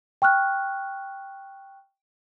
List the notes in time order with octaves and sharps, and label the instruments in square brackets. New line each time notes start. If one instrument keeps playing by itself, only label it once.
[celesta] G5 C#6 F6 F#6